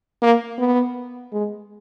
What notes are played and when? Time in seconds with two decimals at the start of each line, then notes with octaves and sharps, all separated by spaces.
0.22 A#3
0.59 B3
1.32 G#3